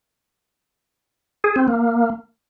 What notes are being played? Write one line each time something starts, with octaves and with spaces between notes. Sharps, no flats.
G#4
C4
A#3